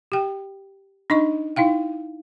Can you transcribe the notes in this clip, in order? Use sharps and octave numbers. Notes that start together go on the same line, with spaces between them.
G4 G5
D4 D#4 D#5 C#6
D#4 E4 F5 G5